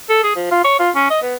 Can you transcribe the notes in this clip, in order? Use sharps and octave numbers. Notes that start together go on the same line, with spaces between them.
A4
G#4
F3
F4
C#5
F4
C#4
D#5
B3